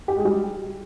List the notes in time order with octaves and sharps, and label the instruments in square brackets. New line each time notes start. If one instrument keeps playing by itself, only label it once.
[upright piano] G4
G#3
G3